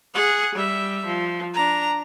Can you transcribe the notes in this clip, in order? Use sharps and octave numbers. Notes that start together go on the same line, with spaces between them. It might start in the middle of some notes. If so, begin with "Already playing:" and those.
G#4 F#5
G3 E5
F3
D4 A#5